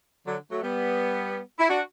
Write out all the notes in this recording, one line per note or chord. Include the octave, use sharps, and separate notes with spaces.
D3 F#3
F#3 A3
G3 B3
E4
D4 F#4